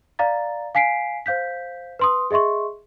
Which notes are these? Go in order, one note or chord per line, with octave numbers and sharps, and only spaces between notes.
D5 F5 A#5 A6
F5 G#5 B6 C7 D7
C5 F5 G6 B6
B4 C6 D#6
G#4 D#5 E5 C6 C#6